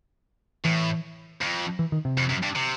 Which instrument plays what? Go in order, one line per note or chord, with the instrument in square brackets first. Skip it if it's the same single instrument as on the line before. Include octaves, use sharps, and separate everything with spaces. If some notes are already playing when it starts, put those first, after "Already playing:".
[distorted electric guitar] A2 [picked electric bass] E3
[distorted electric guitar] F2
[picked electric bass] E3
D#3
C3
[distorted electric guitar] F2
F#2
G2
C3